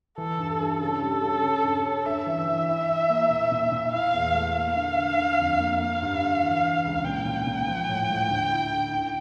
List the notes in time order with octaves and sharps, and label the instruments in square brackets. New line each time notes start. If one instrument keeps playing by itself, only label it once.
[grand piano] E3 [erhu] A4
[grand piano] G2
G2
[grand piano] C#3 [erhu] A4
[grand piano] G3
C#3
C#4
G2
C#4
[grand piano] G2 [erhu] E5
[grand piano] E3
E3
E4
E4
A#3
A#2
A#2
A#2
[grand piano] E4 [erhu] F5
[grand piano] E2
A3
[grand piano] A#3 [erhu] F5
[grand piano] D3
D3
D3
F2
A#3
[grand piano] A#3 [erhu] F5
[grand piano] G2
D3
E3
E3
C#2
[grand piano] A#2 [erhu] G5
[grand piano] A#2
A#2
F3
A2
A2
D2
E4
D3
D3